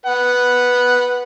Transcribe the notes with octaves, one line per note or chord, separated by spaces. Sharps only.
B4 F#5